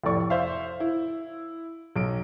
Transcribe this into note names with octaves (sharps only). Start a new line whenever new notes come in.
F1 F2 A2 D5 C#6
C5 E5 F5
E4
B1 D7